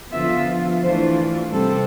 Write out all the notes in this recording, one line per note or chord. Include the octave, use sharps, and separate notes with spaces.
D3 F3 B3 F4 E5
E3 A3 D4 F4 C5
C3 G3 C4 A4